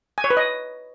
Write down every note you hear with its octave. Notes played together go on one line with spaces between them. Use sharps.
G#5
C#5
B4
D#5